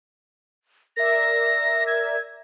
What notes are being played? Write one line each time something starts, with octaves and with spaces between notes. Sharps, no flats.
A#4 D5 E5 A#6
G#6